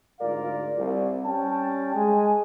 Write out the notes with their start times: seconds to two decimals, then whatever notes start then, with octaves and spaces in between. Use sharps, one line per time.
0.20 D2 G#2 F4 A#4 D5 F5
0.78 C2
1.25 G3 C#4 G5 A5
1.95 G#3 G#5